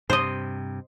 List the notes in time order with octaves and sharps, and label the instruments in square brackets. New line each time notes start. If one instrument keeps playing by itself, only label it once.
[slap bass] G2 C3 [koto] C5 D#5